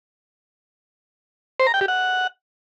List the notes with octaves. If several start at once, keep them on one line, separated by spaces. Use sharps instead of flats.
C5
A#5
G5
G4
F#5